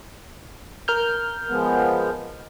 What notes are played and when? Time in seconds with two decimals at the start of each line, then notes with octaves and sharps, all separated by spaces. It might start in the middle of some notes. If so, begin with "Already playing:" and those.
0.88 A#4 F6 G6
1.49 F3 G#3 B3